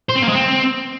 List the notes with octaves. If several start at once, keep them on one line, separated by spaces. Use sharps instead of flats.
C5
C4
A#3
G#3
C4